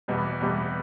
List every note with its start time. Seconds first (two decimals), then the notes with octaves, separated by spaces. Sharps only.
0.08 E2 B2 G3
0.41 E2 B2 G3